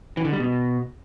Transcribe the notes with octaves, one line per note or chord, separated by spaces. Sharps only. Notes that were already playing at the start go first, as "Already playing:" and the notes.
E3
D3
G3
B2